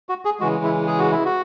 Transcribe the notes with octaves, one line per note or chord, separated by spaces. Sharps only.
F#4
G#4
C#3 E3 G#3 F#4
E4
G#4
F#4
E4
F#4